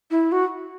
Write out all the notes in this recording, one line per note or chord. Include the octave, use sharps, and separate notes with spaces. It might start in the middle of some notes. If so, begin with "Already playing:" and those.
E4
F#4